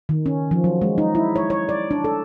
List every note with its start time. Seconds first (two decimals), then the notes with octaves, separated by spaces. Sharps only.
0.09 D#3
0.26 C#4
0.51 F3
0.64 F#3
0.82 G#3
0.98 D#4
1.15 E4
1.36 C#5
1.50 C#5
1.69 D5
1.91 D4
2.04 A4